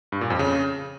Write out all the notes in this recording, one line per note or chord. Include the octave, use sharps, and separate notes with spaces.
G2
A#2
F2
C#3